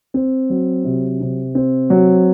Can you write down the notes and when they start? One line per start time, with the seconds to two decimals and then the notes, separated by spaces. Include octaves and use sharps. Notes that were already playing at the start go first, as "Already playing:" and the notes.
0.14 C4
0.50 F#3
0.84 C3
1.20 C3
1.55 C4
1.90 F#3